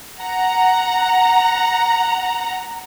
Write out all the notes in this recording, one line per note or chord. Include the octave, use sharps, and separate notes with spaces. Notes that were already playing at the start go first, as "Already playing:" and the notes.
F#5 A#5